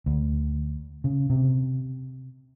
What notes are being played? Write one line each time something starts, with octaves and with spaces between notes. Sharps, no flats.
D2
C#3
C3